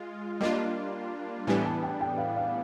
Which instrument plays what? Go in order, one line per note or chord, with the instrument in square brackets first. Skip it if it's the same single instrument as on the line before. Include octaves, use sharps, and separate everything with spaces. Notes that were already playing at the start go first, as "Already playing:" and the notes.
Already playing: [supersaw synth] G#3 F4
[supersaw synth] G3 A#3 D4 F4 [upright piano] D#5
[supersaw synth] A2 E3 G3 B3 D4 [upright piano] G#5
[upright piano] A5
G5
G5
F5
F5